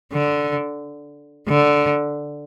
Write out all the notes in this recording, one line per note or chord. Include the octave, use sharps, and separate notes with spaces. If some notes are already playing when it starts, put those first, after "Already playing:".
D3
D3